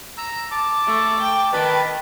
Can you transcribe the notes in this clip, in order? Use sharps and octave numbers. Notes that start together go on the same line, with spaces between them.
A#5 E6
A5 D6
A3
G5
D#3 B4 A5 B5